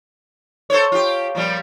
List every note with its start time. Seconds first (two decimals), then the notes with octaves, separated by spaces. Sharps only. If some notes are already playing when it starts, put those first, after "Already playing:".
0.70 A4 C5 C#5
0.92 F4 G4
1.35 A#2 F3 G3